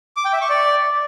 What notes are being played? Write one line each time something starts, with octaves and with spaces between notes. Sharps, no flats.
D6
G5
E5
C#6
D5